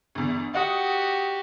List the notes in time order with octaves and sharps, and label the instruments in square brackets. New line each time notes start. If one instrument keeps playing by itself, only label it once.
[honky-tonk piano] G1 E2
[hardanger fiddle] F#4 G4 [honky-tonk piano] D#5 F#5 D#6